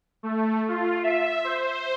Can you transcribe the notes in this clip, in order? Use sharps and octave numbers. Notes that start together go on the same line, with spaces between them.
A3
F4
E5
C5